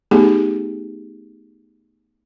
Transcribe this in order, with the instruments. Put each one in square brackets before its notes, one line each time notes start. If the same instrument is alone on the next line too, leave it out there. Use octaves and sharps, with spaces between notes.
[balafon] A3 B3 D#4 G4 G#4